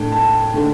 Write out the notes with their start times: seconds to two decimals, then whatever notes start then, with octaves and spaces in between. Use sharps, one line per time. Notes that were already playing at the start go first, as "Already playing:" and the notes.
Already playing: A2 A3 D4 G5
0.12 A5
0.53 D3 A3 D4